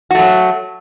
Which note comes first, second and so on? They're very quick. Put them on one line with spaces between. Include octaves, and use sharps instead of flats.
F#4 A3 F#3